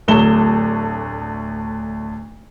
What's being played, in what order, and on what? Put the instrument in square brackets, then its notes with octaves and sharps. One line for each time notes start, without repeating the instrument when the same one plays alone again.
[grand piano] D1 D2 F#3 E7 G7